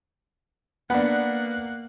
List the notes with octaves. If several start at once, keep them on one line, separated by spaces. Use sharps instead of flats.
A#3 B3 D4 F#5 F#6